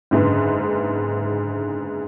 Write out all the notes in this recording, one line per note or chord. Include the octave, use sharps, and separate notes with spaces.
F#1 G#2 D3 B4